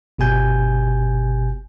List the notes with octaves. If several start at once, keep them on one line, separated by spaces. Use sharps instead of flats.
G1 B2 G4 G#5 G6